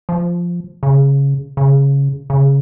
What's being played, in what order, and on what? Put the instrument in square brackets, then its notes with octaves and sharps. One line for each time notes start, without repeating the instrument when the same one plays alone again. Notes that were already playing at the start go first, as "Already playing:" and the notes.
[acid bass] F3
C#3
C#3
C#3